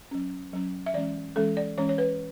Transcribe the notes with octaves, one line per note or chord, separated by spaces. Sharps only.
F#3 C#4
F#3 C#4
E5
E3 G#3 C#4 D5
E3 G#3 C#4 A4
D5
E3 G#3 C#4 C#5
C#5
B4